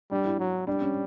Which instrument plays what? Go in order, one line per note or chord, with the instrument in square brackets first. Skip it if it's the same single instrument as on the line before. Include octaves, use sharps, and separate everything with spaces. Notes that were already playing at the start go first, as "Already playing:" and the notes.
[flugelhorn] G3 [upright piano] D4
[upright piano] E4
[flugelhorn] F#3
[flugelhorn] G3 [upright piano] D4
[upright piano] C#4